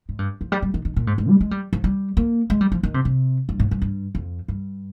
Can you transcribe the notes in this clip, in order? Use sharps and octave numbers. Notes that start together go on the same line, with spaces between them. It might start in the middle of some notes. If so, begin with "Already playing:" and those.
G#2
G2
F3
G3
G3
D#3
D#3
A#2
G#2
G#2
G3
G#3
G3
F3
G3
A#3
G#3
G3
F3
D#3
C3
C3
G2
G#2
G2
G2
F2
G2